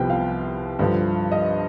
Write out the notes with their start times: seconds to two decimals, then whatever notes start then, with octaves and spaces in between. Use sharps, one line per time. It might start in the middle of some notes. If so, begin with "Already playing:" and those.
Already playing: C2 C3 F3 B3 G5
0.10 F5
0.79 G2 D3 F3
1.32 D#5